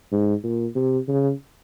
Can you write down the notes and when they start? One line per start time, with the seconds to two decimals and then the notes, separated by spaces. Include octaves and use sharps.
0.12 G#2
0.43 A#2
0.76 C3
1.08 C#3